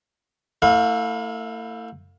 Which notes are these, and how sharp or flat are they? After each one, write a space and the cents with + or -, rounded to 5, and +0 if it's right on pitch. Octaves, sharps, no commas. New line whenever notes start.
A3 +40 E4 +0 F5 +35